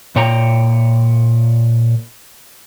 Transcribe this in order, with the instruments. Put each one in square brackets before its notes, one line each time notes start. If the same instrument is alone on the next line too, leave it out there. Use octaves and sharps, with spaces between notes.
[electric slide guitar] A#2 C#5 G5 A#5